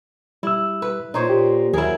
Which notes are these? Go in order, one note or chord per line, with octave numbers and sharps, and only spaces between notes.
G3 E4 E6
B4
A#2 D#4 C5 C#5
G4
D#2 F#3 E4 G#4 A#4